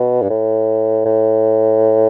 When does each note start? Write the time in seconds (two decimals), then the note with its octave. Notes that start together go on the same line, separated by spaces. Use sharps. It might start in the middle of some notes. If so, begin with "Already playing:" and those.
Already playing: B2
0.22 G2
0.30 A2
1.06 A2